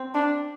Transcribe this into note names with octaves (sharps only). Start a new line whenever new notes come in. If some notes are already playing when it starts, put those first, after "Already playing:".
Already playing: C4
D4